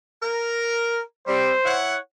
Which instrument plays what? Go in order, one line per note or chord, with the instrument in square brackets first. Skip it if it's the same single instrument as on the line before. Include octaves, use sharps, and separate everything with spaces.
[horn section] A#4
[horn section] G3 C4 [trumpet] C5
[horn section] E4 C#5 F#5